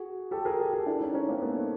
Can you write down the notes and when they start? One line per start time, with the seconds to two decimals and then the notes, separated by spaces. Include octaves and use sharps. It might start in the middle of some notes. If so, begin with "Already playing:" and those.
Already playing: F#4 G#4
0.31 G4 A4
0.45 G#4 A#4
0.59 G4 A4
0.73 G4 A4
0.86 D4 E4
1.00 C#4 D#4
1.14 C#4 D#4
1.28 A#3 C4
1.42 A3 B3